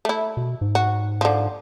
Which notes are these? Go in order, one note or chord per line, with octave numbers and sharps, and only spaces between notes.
A3 E4
B2
G#2
F#4
D3 F3